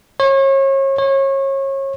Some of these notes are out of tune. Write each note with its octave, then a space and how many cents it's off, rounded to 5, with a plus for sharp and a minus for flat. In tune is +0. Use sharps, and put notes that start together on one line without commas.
C#5 -35
C#5 -30